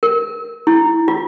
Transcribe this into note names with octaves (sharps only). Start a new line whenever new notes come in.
A#4
E4
F4